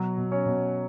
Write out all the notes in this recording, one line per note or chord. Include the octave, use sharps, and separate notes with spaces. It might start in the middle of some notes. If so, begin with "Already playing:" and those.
Already playing: B2 F#3 F#4
B2
C#4 C#5
B2